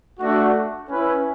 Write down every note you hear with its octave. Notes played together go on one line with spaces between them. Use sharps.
A3 D4 F#4
C#4 E4 B4